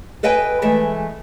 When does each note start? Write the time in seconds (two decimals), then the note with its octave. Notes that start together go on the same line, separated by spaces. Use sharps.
0.23 A4 B4 D#5 G5 G#5
0.62 E3 G#3 A3 A4